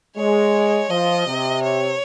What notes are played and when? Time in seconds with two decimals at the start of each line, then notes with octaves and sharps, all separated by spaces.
0.16 G#3 C#5
0.90 F3 D#5
1.27 C3
1.63 C#5